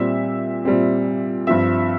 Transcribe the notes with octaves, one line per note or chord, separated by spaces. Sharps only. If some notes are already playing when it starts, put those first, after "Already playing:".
Already playing: A#2 G3 C4 E5
A#2 G3 C4
G2 F3 C4 E5